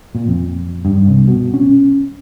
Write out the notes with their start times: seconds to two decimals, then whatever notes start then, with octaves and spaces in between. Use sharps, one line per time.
0.15 A#2
0.28 F2
0.85 G2
1.08 C2
1.27 B2
1.54 C#4